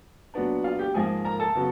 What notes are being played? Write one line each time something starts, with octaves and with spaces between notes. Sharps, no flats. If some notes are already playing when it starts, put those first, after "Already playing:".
A#2 F#3 B3 D4
F4 F5
G4 G5
G#2 F3 A#3 G#4 G#5
A#4 A#5
A4 A5
C#3 F#3 B3